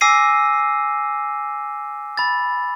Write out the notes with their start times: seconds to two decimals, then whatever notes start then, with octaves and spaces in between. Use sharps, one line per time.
0.01 G#5 D6 E6 A#6 C7 D#7
2.17 B5 A6